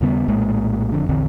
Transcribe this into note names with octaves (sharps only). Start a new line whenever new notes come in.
D#2 C#3 G3 B3
A#1 A2 G#3 A#3
F#1 F2 D3
A#1 E2 D3 C4